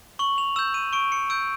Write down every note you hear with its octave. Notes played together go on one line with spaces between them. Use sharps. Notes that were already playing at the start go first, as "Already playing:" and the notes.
C#6 F#7
F7
E6 G6 E7
D#7
C#6 D7
C#7
E6 G6 D7